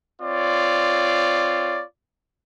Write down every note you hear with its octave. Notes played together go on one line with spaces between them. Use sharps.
C4 F4 C#5 D5